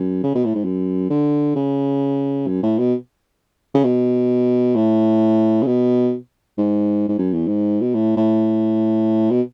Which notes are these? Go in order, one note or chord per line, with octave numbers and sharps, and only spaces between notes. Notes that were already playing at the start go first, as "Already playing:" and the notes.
Already playing: F#2
C#3
B2
A2
G#2
F#2
D3
C#3
F#2
A2
B2
C#3
B2
A2
C#3
B2
G#2
G#2
F#2
E2
G#2
B2
A2
A2
B2